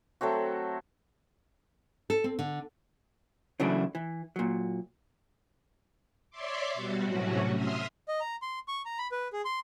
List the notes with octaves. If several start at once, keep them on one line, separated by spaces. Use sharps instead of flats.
F#3 A3 C4 F#4
A4
C4
D3
C#3 E3 F#3 A3 D4 E4
E3
A#2 F#3
C#5 D5 E5 C6 D6
B2 G3 F#4
A2 C3 F#3 A3 C#4 F#4
E5 C6 D#6 F6
D#5
A#5
C6
C#6
A#5
B5
B4
G#4
C6